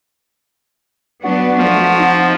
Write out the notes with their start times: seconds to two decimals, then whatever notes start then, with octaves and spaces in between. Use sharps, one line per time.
1.24 F#3 B3 D4 F#4
1.58 F3 A3
1.96 C4 D#4